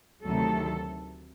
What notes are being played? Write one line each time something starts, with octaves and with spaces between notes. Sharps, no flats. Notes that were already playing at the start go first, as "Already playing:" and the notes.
D2 C3 D#3 F#3 A4